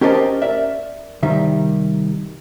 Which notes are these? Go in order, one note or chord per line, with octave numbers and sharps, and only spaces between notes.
C#4 G4 A#4 C5 D#5 A5
A#4 D5 E5
C2 D#3 G3 E5